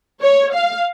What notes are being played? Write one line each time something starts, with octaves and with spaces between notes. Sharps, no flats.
C#5
F5